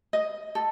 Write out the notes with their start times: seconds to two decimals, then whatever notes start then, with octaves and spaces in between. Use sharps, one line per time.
0.13 D#5
0.55 A4